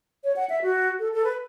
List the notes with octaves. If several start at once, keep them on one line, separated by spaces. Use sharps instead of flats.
C#5
F#5
E5
F#4
A4
A4
B4